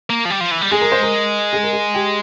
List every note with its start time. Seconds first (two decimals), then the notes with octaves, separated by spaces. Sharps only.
0.10 A#3
0.25 F3
0.30 G3
0.41 F3
0.51 E3
0.61 G3
0.71 G#3 G#4
0.81 A#4
0.92 C5
1.03 A#4
1.53 G#4
1.63 A#4
1.73 G#4
1.94 G4